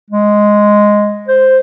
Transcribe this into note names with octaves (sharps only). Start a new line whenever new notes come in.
G#3
C5